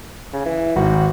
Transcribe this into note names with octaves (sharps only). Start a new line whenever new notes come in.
C#3
E3
G#1 G#2 F#4